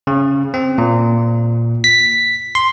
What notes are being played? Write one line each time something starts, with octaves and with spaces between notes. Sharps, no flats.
C#3
C4
A#2
B6
C6